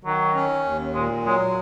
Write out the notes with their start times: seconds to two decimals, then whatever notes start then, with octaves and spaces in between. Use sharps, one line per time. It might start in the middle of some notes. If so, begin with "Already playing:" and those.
0.04 D#3 F#3
0.35 C#4
0.65 D#2
0.94 A#2 G#3
1.25 F#3 G#3